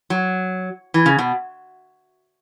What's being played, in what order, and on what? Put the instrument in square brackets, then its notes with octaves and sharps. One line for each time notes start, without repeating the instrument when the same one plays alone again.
[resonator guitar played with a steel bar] F#3
E3
C#3
B2